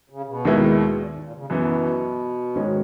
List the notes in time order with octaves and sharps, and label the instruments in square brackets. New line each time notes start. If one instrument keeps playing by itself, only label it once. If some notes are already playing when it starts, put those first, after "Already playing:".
[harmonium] C#3
B2
[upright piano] D#2 D#3 G#3 B3 E4
[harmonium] A#2
G#2
A#2
C#3
[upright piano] F#2 E3 B3 [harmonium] B2
[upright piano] G#2 D#3 G#3 C#4